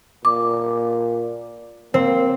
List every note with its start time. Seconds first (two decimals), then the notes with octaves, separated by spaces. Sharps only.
0.25 A#2 D6
1.94 A#3 C4